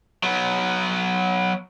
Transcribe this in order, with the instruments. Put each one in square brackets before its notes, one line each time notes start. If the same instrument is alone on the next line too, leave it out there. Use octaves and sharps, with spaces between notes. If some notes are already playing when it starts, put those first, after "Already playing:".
[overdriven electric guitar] F#3 B3